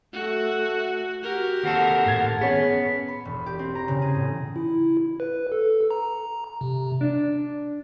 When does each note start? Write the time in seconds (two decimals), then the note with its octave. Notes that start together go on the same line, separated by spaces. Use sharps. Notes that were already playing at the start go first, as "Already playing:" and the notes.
0.13 A3 F#4
1.22 F#4 G4 A#4
1.63 D#2 C4 A4 F#5
2.06 A2 G#6 A6
2.41 B3 C#4 G#4 C#5
3.08 B5
3.25 E1
3.46 G4
3.59 C4
3.75 A#5
3.88 C#3
4.02 G#4
4.14 A2
4.56 E4
5.20 B4
5.52 A4
5.91 A#5
6.61 C3
7.01 D4